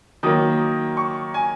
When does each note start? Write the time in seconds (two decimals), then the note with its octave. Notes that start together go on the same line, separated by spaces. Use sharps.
0.23 D#3 F#3 A#3 D#6
0.97 C#6
1.34 G#5